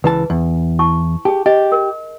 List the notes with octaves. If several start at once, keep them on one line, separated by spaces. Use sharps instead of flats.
C#2 E3 B4 A5
E2
E4 A5 C#6
G4 G#4 A5
G4 D#5
A#4